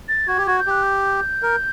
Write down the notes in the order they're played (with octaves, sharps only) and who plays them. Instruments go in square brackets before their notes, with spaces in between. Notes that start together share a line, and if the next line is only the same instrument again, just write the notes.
[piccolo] A6
[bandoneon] F#4 [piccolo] G#6
[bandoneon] G4
[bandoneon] F#4 [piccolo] G#6
[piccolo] G6
[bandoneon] G4 [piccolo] F#6
[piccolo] G6
[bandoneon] A#4